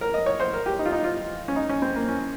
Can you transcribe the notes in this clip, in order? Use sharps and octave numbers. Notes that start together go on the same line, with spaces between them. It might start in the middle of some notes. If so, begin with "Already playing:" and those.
A#4
D#5
C#5
C5
A#4
G4
D#4
F4
D#4
F4
C#4
D#4
C#4
C4
A#3
C#4